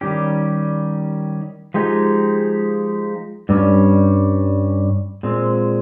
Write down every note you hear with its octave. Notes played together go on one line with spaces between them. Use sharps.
D#3 G3 C#4 G4
F3 G#3 D#4 G4
G2 G3 C#4
A#2 G#3 C4